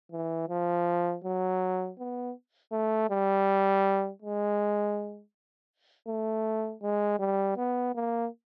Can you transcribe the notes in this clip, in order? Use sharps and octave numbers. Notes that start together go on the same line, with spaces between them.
E3
F3
F#3
B3
A3
G3
G#3
A3
G#3
G3
B3
A#3